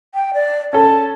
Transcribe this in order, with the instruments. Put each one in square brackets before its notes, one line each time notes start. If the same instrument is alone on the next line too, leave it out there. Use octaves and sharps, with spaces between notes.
[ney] G5
D5
[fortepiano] C#4 A4 [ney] A5